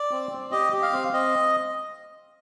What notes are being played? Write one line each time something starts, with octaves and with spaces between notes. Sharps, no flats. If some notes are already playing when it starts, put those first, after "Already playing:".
Already playing: D5
C4
C4
G4 D#5
G4
F5
C4
C4 D#5